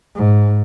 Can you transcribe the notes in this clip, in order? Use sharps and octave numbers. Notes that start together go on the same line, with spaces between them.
G#2